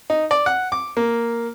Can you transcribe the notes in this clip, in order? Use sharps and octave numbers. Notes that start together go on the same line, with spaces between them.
D#4
D5
F#5
D6
A#3